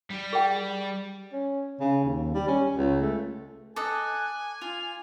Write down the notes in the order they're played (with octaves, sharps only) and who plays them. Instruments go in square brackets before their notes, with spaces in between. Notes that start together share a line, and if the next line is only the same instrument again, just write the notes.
[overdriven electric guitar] G3
[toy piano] G#4 G5
[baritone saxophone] C#4
C#3
D#2
G3
C#4
C#2
A3
[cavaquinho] A4 D#5 D#6 [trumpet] G#5 [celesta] D6 [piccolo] F#6
[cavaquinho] F4 [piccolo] F7